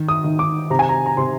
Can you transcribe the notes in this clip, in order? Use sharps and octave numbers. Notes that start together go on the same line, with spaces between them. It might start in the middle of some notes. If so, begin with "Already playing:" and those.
Already playing: D#3
D#6
D#3
D6
C3 A#5
G#5
A#5
A#5
C3 C6